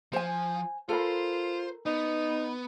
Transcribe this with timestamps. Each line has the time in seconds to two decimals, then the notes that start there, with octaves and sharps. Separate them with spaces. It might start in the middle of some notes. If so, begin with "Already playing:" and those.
0.13 F3 C5 G#5
0.89 F4 A4 A#4 C5 B5
1.86 B3 D#4